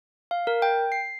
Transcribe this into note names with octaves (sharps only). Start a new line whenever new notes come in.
F5
A#4
G5
C7